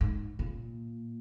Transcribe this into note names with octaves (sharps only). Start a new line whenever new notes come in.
G#2
A#2